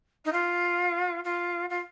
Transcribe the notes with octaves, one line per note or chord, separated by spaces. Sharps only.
D#4
F4
F4
F4